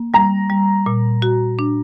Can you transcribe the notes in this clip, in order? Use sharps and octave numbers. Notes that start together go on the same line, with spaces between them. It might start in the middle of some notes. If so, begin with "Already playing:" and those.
Already playing: A#3
G3 A#5
G3
A#2
F#4
D4